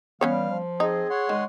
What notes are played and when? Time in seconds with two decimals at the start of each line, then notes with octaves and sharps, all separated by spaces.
0.21 E3 G3 B3 C#4 C#5 F5
0.49 F3
0.80 C4 D#4 G#4 D#5
1.10 C#5 F#5 C6
1.29 D#3 G#3